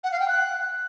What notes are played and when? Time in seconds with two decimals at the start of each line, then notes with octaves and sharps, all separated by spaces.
0.04 F#5
0.12 F5
0.20 G5
0.28 F#6